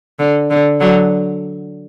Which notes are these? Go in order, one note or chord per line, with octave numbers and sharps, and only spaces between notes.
D3
D3
D3 F#3